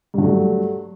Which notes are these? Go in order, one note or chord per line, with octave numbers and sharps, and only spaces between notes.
G2 F#3 A3